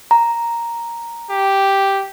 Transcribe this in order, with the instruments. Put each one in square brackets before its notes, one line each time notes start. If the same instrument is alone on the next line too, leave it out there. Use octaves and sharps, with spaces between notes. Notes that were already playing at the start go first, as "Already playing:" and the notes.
[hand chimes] A#5
[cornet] G4